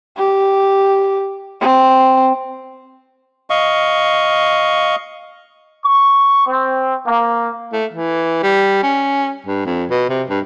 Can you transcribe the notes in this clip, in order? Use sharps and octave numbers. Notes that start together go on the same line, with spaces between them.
G4
C4
D#5 F5 C#6
C#6
C4
A#3
A3
E3
G3
C#4
G2
F2
B2
C3
G2